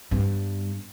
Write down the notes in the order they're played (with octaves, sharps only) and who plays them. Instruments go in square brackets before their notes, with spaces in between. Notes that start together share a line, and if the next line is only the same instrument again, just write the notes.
[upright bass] G2 B3